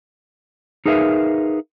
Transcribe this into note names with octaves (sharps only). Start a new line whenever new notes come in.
D#4 G#4 A#4 B4 E5 F5